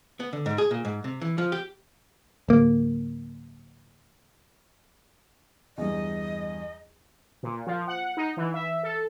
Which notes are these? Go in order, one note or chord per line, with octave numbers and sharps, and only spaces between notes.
B3
D3
G#2
G#4
A#2
G#2
C3
E3
F3
G4
D1 A#3
E2 G2 D#5
A#2
F3
F#5
D#4
E3
E5
A4